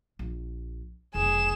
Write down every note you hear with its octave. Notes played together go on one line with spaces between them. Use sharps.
A#1
F1 B1 G#4 E7